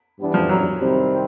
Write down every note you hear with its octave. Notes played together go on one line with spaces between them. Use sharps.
G2 E3 G3 B3 D4
F3
F#3
C3 D#3 G3 C4